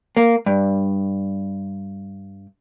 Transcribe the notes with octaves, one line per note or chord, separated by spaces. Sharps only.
A#3
G2